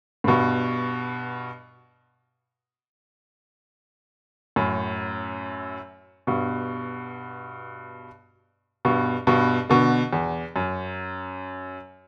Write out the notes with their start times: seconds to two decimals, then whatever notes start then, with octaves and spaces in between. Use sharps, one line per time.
0.24 A2
0.27 G2 B2
4.56 F#2 A2
6.27 G2 B2
8.85 G2 B2
9.27 G2 B2
9.70 B2 D3
10.13 E2
10.56 F#2